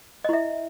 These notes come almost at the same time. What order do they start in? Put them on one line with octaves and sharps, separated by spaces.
D#5 E4 E5